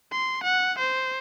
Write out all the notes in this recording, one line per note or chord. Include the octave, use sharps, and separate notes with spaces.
C6
F#5
C5